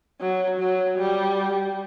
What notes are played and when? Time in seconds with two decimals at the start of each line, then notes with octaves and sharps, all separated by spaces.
0.21 F#3
0.60 F#3
0.98 G3